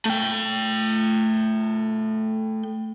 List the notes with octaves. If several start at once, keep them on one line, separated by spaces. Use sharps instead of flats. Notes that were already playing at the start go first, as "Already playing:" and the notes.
A3 G5